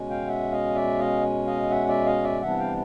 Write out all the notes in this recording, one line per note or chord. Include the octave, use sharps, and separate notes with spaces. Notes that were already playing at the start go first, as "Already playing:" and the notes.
Already playing: B2 G#3 C#4
F5 G5
E5 F#5
D#5 F5
D5 E5
D#5 F5
D#5 F5
E5 F#5
D5 E5
D#5 F5
D5 E5
C3 E3 G3 B3 D4 E5 F#5
F5 G5